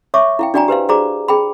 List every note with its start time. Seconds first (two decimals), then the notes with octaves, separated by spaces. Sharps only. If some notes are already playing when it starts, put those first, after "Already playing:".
0.14 C#5 E5 C#6 D6
0.39 E4 F5 G5
0.54 D4 F#4 D5 G5 G#5 A#5
0.68 G4 B4 C5 F5
0.89 F#4 G#4 C5 D5 A#5 D6
1.28 G#4 G5 B5